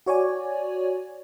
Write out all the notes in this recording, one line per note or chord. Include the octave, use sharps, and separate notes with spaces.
F#4 C#5 D5 G#5